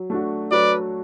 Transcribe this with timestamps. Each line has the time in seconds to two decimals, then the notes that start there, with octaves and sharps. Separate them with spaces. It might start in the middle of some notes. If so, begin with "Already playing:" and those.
Already playing: F#3
0.10 A3 D4 F#4
0.51 F#3 B4 D5